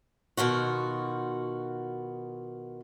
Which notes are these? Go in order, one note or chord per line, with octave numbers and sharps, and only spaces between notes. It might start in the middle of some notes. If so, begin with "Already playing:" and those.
B2 D#3 F4 F#4